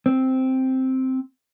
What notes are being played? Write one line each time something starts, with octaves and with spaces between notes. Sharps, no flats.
C4